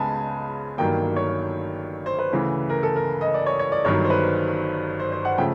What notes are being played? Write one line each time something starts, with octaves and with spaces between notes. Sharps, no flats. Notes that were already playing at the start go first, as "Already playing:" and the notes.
Already playing: C#2 C#3 G#3 B3 G#5 A5 B5
G1 G2 D#3 F#3 A#3 G5
C#5
C5
B4
D2 C#3 E3
A#4
A4
A#4
D#5
D5
C#5
C#5
D5
G1 G2 D#3 F#3 C#5
C5
B4
C5
C5
F#5
C#3 F3 A3 G5